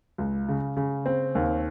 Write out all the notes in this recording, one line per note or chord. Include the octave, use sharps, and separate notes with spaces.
C#2
C#3
C#3
C4
D#2